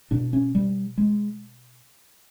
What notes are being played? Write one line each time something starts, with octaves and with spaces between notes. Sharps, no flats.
B2 D4
C#4
G3
G#3